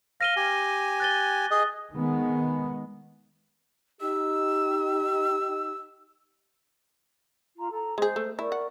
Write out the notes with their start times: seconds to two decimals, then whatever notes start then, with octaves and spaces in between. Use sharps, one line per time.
0.21 F5 A#6 D#7 G7
0.37 G4 G#5
1.00 F#6 A6 G7
1.51 G#4 D#5
1.92 D#3 G#3 B3
4.01 D#4 G4 E6
7.58 F4 A#5
7.71 A4 A#5
7.98 G#3 G#4 C5
8.16 A3
8.39 E4 A#4 D5 C#6
8.52 F#5